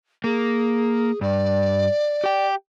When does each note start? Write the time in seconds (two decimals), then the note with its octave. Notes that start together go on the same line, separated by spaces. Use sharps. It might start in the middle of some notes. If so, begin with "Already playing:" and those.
0.24 A#3 G#4
1.21 G2 D5
2.24 G4 G5